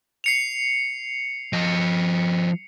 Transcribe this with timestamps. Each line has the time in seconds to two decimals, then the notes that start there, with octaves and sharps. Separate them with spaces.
0.24 C7 C#7 F7
1.53 F3 D#5